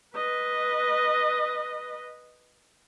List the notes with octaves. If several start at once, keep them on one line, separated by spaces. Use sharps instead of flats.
B4 D#5